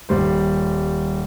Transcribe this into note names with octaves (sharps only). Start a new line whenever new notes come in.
D#1 G3 C5